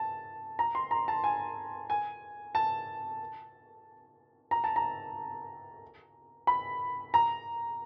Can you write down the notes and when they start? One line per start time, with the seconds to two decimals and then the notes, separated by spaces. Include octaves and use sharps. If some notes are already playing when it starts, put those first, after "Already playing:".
Already playing: A5
0.59 A#5
0.75 C6
0.91 A#5
1.08 A5
1.24 G#5
1.90 G#5
2.55 A5
4.51 A#5
4.64 A5
4.76 A#5
6.47 B5
7.14 A#5